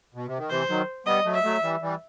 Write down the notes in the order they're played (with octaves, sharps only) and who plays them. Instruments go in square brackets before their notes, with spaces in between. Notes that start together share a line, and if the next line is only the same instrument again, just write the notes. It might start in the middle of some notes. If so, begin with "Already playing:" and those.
[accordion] B2
C3
D#3
[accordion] C3 E3 [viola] C5
[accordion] D#3 F#3
[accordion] G3 B3 [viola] D#5
[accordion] F#3 A3
[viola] E5
[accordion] F#3 A3
E3 G3
E3 G3